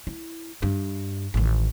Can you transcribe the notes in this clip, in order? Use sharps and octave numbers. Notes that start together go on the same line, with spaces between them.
E4
G2
A1 D#3